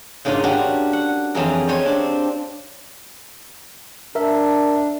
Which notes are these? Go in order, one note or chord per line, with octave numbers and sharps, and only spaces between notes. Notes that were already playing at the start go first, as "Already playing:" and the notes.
G#2 C#3 A#3 D4 F4 D#5
G3 C#4 D4 F#4 G4
F#5
F2 E3 C#4 E4 G#4 A#4
G3 C#4 F4 C5 C#5 D#5
C4 D4
D4 A#4 E5